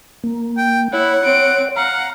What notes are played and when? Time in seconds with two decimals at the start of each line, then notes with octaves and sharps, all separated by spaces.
0.24 A#3
0.57 G5
0.93 E4 C#5 F#5 B5
1.24 C4 D7
1.76 F5 F#5 A#5